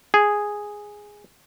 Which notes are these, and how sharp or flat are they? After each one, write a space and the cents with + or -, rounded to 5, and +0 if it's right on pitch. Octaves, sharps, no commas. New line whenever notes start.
G#4 -5